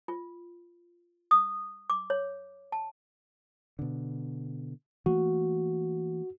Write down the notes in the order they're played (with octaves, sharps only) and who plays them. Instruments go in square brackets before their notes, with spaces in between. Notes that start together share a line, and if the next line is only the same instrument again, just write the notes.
[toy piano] F4
D#6
D6
C#5
A5
[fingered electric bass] B2 D3
[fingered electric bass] E3 A3 A#3 [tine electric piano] F#4